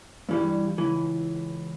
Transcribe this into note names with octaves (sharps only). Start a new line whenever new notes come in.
G2 E3 G3
C#2 E3